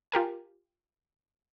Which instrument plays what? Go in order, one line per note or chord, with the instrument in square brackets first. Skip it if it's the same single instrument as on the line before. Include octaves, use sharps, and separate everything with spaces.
[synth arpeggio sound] F4 G4 A#4 G#5